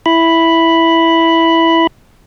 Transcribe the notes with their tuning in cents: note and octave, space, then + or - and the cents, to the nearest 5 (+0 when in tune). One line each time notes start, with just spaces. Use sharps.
E4 +0 B5 +0